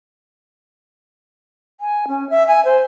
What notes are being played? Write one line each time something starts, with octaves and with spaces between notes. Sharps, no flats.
G#5
C#4
E5
G#5
C5